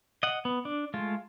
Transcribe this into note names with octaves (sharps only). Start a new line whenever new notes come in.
D#5 F#5
B3
D4
G#3 A3 F4